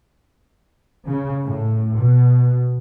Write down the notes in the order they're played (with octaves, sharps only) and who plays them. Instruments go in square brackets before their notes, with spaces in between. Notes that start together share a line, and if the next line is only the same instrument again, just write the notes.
[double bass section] C#3
A2
B2